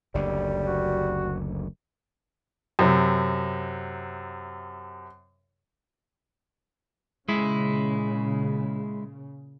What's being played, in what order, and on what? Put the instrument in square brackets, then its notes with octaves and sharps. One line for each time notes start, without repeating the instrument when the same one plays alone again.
[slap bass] F#1 D2 D3 [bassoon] G3
[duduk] F#4
[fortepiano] F#2 C3
[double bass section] A#2 C#3 [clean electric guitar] G#3 E4